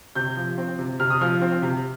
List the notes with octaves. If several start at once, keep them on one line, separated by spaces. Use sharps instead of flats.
C3 G6
F3
C4
C3
C3 F6
D#6
F3 F6
C4
C3